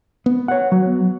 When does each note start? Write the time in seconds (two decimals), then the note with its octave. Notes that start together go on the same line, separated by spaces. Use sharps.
0.26 B3
0.48 C#5 F#5
0.72 F#3